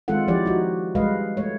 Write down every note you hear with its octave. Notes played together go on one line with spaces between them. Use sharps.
D#3 G#3 C4 F4 A4 F#5
F3 E4 G4 C#5 D5
D#4 F#4
G3 G#3 B4 D#5 F5
A3 C#5